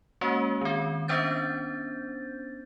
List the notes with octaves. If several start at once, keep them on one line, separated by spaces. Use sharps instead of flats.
G#3 A#3 C#4 F#4
D#3 C4
B3 C#4 D4 C5 G6 A6